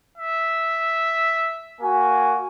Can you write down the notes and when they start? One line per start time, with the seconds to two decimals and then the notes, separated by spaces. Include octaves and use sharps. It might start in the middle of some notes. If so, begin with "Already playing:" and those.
0.18 E5
1.81 A#3 F#4 G#5